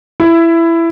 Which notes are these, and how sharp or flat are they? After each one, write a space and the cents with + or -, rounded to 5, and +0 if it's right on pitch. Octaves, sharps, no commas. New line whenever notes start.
E4 +15